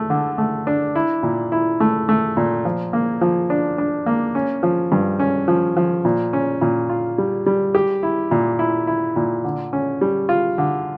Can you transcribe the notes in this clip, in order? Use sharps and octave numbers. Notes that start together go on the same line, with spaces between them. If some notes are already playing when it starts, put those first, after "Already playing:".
Already playing: A3
D3
A3
D4
E4
A#2
E4
A3
A3
A#2
F3
A#3
F3
D4
D4
A#3
C#4
F3
G2
C#4
F3
F3
A#2
C#4
A#2
F4
G3
G3
G4
E4
A#2
E4
E4
A#2
D3
C#4
G3
F4
D3